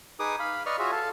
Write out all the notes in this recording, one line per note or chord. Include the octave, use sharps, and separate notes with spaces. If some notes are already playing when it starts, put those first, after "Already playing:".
D#4 G#4 B4 D6 D#6
F5 B5
B4 D5 D#5 C#6 F6
F4 F#4 G#4 C#5 E5
A4 F5 A5